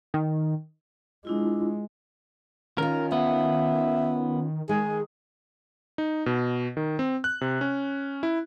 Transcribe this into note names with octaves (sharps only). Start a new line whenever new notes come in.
D#3
G#3 D4 E4 F4
D#3 C#4 F4 A#4
B3 E5
D#3 G#3 G#4
D#4
B2
D#3
C4
F#6
C3
C#4
E4